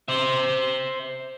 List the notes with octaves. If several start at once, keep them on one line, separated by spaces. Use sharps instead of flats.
C5 E5